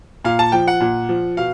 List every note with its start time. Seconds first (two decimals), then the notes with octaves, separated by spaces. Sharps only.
0.24 A#2 F5
0.39 A5
0.52 F3 G5
0.68 F#5
0.81 A#2
1.09 F3
1.37 B2 F5